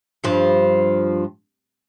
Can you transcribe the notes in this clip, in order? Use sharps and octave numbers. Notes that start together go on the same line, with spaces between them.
G2 F3